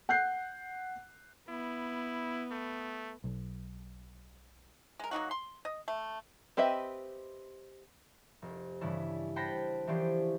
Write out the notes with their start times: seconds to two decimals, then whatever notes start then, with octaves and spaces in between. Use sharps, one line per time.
0.09 F#5 F#6 G6 C7
1.49 B3 E4
2.51 A3
3.24 B1
4.99 G#3 A#4
5.11 F#3 A#3 D#4 F#4
5.31 C6
5.65 D#5
5.88 A3
6.57 C4 G4 B4 D#5 E5
8.42 F1
8.81 G2 C#3 E3 C#4 D4 E4
9.36 C5 F#5 G5 A5 B5 A#6
9.87 E3 F3 C#4 G4 C5 D5